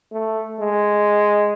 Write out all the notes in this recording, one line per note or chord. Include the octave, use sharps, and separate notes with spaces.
A3
G#3